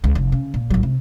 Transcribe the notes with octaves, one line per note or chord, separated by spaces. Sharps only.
C#2
F1
C#3
A#2
A1 F#3
C3